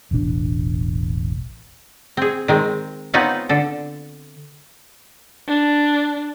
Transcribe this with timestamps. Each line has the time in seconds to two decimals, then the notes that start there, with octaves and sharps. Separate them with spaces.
0.11 E1 A1 B2 D4
2.17 C4 G#4
2.48 D#3 G#3 C4
3.14 B3 C4 D#4 F4 B4 C#5
3.49 D3 A4
5.47 D4